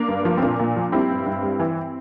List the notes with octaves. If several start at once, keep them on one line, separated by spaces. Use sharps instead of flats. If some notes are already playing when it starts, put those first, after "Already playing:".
Already playing: A#3 D4
G2
F3
C4
A#2 A#3 D4
A#2
F3
G3 C4 E4
G2
G2
G3
E3